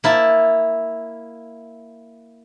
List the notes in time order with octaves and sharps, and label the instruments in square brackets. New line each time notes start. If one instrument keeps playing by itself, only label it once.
[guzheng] A#3 E4 A5